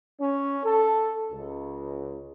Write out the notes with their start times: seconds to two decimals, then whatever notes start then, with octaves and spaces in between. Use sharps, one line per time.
0.20 C#4
0.64 A4
1.32 C#2